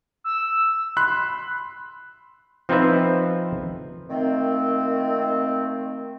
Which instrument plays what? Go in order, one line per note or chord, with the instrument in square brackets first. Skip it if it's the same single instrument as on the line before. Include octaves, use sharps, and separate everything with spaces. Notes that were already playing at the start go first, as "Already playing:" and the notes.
[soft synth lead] E6
[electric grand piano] B5 C6 F#6
[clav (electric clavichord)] F3 C4 D#4 F4 B4 E5
[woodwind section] A#2 D#3 A3 C4